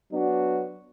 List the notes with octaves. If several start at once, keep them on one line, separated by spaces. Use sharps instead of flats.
F#3 B3 D4 F#4